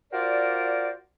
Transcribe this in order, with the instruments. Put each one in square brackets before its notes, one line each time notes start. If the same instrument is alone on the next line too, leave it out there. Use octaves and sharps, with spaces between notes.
[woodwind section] F4 F#4 A#4 C5 D5